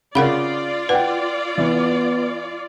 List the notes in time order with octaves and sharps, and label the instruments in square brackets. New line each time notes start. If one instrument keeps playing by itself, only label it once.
[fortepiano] C#3 [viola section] F4 D5 [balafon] A#4 F#5 B5
[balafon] B4 [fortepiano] F#5 G5
[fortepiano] E3 [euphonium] B3